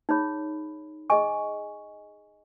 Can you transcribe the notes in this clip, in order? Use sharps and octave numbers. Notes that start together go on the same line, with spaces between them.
D#4 G#4 C#5 B5
G#4 D#5 G#5 C#6